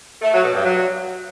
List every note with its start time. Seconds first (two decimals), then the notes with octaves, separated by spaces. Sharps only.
0.22 A3
0.33 F#3
0.43 B2
0.54 G2
0.64 F#3